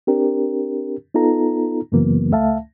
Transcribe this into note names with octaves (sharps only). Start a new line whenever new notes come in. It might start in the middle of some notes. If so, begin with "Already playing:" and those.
C4 D4 G4 A#4
B3 D#4 F4 A4 A#5
F#2 C#3 E3 F#3 A#3 B3
C#2 A3 E5 F5 A5